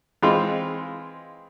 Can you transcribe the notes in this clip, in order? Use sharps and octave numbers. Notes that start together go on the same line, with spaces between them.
E3 G#3 C4 F4